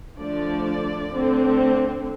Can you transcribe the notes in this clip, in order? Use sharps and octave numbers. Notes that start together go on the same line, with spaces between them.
D3 F3 A3 D4 D5
D3 A3 C4